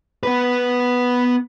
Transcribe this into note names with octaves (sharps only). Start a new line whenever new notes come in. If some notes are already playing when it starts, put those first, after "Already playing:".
B3 B4